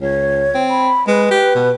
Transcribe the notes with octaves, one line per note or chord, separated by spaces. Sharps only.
C#2 C#5
C4
B5
G#3 B4
G4
B2